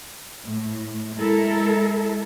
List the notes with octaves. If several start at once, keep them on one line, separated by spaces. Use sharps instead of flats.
A2
G#3 E4 A4 A#4